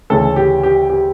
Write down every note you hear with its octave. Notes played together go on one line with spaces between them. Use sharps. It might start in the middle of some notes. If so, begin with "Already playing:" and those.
D2 C#3 E3 A3 C#4 A4
G4
G4
G4